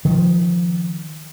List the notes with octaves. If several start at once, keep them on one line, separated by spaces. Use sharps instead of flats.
D#3 F3